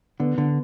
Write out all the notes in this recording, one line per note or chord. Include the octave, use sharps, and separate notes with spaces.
D3 B3
D3 B3